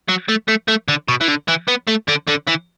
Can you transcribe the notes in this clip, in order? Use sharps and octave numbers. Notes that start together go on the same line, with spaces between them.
F#3
A3
A3
A3
D3
B2
E3
D3
E3
B3
A3
D3
D3
E3